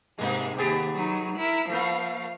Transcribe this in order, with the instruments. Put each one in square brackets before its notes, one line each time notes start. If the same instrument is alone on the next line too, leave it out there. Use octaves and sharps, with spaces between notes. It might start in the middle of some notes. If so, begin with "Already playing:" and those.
[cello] G#2 C3 [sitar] G#3 A#3 D#4
[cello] D#2 [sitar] B3 G4 G#4
[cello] F#3 D#4
E4 A#4
[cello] F3 F5 [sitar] A3 A#3